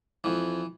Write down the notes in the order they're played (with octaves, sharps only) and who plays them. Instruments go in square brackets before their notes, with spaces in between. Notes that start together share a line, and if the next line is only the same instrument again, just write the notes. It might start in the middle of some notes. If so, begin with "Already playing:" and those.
[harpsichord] F2 E3